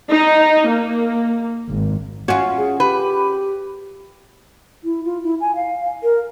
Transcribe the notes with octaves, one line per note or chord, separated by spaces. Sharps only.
D#4
A#3
G#1
C#4 F4 F#4
G#4
G4 B4
E4
F4
E4
G#5
F5
A#4